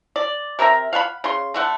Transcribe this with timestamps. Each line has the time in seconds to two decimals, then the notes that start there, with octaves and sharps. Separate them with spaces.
0.16 D5
0.59 C3 A#4 E5 A#5
0.93 F5 F#5 G#5 B5
1.24 C#3 C6
1.54 D3 A3 F#5